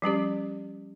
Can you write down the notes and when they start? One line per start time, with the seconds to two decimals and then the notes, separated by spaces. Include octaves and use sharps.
0.02 F3 G3 C#4 G4